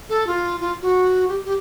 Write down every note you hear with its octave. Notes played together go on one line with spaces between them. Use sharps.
A4
F4
F4
F#4
G4
G4